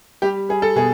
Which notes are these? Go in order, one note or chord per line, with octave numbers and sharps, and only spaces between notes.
G3 G4
G3 G#4
A4
B2 G#4